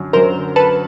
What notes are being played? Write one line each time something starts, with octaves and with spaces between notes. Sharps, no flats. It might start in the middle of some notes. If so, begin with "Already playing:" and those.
Already playing: F#2 D3 F#3
F#2 D3 F#3 A#4 C5
A4 B4